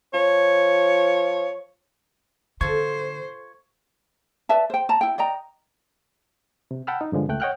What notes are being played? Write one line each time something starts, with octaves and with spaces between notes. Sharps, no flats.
F3 C#5
D3 F4 A4 C5 C#6 G#6
B4 D5 E5 A5
C5 G5
A5 A#5
E4 G5
D5 D#5 G5 A#5
C3
F#5 G5 A5 B5 E6 F6
D#4
G2 D3 F3 G#3
C#2 A3 G5 F#6
C#5 D#5 F#5 G5 F6 F#6